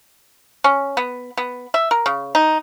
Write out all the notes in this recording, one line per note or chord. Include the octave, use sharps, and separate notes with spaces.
C#4
B3
B3
E5
A#4
C#3
D#4